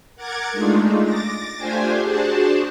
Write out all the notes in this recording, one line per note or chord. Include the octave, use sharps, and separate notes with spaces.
A#4 F#5 D6 G#6 A6
G#3 A3 D4 D#4 F4
D6 A6 A#6
A3 D4 F4 G4 C5 G#5
D4 F#4 G#4 C5 A5